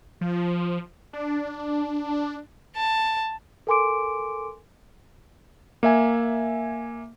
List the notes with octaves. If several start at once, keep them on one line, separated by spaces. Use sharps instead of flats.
F3
D4
A5
A4 A#4 G#5 C6 D6 D7
A#3 E5 G#5